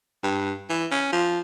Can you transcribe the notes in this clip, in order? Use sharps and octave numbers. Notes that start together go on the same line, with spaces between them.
G2
E3
C#4
F3